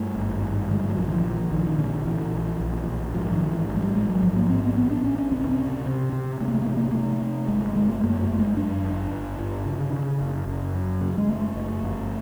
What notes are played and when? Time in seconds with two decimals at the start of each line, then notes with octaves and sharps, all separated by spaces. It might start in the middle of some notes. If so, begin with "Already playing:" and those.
Already playing: G2 A3
0.15 G#1
0.43 G2
0.70 D3 G#3
0.80 G3
0.89 F#3
0.97 A#1 F3
1.10 E3
1.24 A#2
1.38 F3
1.51 A#1 D#3
1.65 D#3
1.78 A#2 D3
2.05 A#2 E3
2.33 A#1
2.60 A#1
2.88 A#1
3.14 G#2 F3
3.32 D#3
3.41 G#2
3.51 E3
3.69 A1
3.76 G#3
3.82 G3
3.95 A1 G#3
4.09 F#3
4.23 G#2 F3
4.36 A#3
4.49 A1 C4
4.63 B3
4.77 A1 B3
4.90 D4
5.04 A1 C#4
5.18 C#4
5.31 C#2 C4
5.41 C#4
5.49 C4
5.58 C3
5.86 C3
6.12 C3
6.40 C3 A3
6.48 A#3
6.54 A3
6.62 A#3
6.67 C3 A3
6.77 A#3
6.84 A3
6.91 A#3
6.94 C3 A3
7.22 C3
7.48 G1 G#3
7.62 G#3
7.76 G1 G#3
7.89 A3
8.03 F#2 A#3
8.21 A3
8.31 G1
8.39 G#3
8.57 F#2 D4
8.84 G1
9.11 G1
9.39 G1
9.66 C#3
9.92 C#3
10.21 F#1
10.47 F#1
10.74 F#2
11.01 C#3
11.17 G#3
11.29 F#1 A3
11.55 F#1
11.83 G1